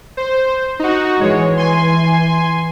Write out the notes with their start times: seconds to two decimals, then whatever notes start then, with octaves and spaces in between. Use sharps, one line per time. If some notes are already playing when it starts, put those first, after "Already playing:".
0.17 C5
0.79 D#4 F#4
1.20 E3 G#3 C#5
1.57 G#5 C6